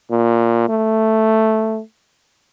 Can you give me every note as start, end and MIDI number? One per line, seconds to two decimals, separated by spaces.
0.10 0.64 46
0.69 1.80 57